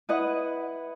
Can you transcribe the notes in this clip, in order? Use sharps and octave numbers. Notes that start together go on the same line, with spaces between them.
E4 B4 D#5 F#5